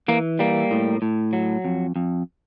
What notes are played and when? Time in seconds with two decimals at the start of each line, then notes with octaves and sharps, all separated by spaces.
0.08 E3 A#3
0.39 G3 A#3
0.71 A2
1.02 A2
1.33 F#3
1.65 F2
1.96 F2